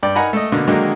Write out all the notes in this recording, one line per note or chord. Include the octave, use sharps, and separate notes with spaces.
G2 D5 G5
D#4 A#4 F#5 G#5 A#5 B5
A3 D#5
B2 D3 A#3
D3 D#3 F#3 G#3 A#3 D#4